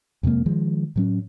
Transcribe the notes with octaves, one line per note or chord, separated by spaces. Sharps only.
F2 C3 G#3 A#3
D#3 F3 G#3
A2 F#3 C#4